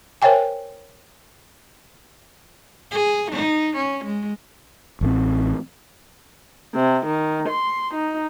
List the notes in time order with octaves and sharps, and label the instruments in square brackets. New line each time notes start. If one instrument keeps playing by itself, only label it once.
[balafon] A#4 C5 C#5 E5 G5 G#5
[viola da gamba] G#4
D#4
C#4
G#3
[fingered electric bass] A1 A2 C4
[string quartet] C3
D#3
C6
D#4